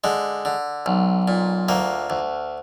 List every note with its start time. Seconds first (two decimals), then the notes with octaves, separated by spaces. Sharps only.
0.04 D3 G#3
0.45 D3
0.86 B1
1.28 A#2
1.69 D2 A#3
2.10 D2